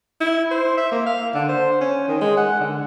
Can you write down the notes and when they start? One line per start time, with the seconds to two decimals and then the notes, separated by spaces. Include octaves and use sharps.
0.21 E4
0.51 C5
0.77 E5
0.92 A#3
1.06 F5
1.34 D3
1.49 C5
1.81 C#4
2.08 D#3
2.21 G#3
2.37 F#5
2.60 D3